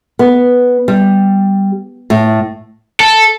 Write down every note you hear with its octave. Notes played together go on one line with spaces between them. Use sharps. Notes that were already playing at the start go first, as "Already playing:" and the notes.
B3
G3
A2
A4